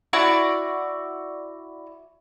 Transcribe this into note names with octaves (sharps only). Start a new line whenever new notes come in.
E4 F#4 D5